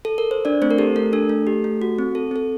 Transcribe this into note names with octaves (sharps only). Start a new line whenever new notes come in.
A4
A#4
C5
D4 D5
A3 C4 C5
A#4
G4 A4
A3 A#4
D4 A4
A3
G4
A3
F#4
C4
A4
C4 A4